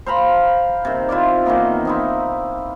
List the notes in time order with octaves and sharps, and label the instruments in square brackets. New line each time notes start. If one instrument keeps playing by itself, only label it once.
[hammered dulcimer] C5 F5 A#5 B5
C3 D#3
E4 F4 C5 D5
D#3 E3 A#3 B3
C4 D#4 E4